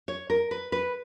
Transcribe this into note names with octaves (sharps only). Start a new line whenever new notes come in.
C#5
A#4
B4
B4